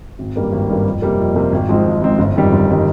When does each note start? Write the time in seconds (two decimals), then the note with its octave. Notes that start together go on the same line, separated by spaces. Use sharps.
0.19 G#1
0.36 G2 G3 A#3
0.52 G#1
0.69 G2 G3 A#3
0.86 F2
1.02 C3 G3 A#3
1.19 F2
1.35 C3 G3 A#3
1.52 G#1
1.69 G#2 F3 G#3 C4
1.86 G#1
2.02 G#2 F3 G#3 C4
2.19 G1
2.35 F2 D#3 G3
2.52 G1
2.70 D#3 G3